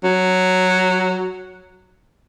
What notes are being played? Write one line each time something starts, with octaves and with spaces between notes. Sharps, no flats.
F#3